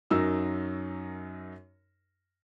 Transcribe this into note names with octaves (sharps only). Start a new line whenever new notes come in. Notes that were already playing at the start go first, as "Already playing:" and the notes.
F#2 F#3 D#4 A#4 E6